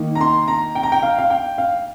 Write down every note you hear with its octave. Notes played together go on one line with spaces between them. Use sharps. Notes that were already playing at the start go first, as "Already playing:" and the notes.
Already playing: D#3 A#3 D#4
A#5
C6
A#5
G5
A#5
G5
F5
F5
G5
F5